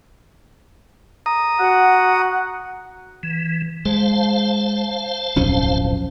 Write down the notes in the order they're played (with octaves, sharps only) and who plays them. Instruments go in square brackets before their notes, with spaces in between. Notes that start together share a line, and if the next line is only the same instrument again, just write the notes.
[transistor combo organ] A#5 D#6
[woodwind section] F#4 F#5
[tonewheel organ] E3
[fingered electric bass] G#3 [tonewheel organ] C5 F5 A5
[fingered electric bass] D1 [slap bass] B1 F2 C#4